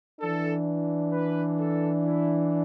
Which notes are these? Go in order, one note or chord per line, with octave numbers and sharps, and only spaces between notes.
E3 D4 A4
B4
A4
E4